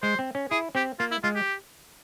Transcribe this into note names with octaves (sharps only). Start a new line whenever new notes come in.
G#3 C5
C4
C#4
E4 G#4
C4 G4
A#3 F4
E4
G#3 F4
G4